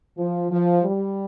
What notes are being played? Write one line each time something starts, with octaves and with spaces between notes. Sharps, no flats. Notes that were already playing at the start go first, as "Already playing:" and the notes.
F3
F3
G3